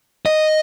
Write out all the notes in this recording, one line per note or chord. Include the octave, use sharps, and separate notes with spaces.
D#5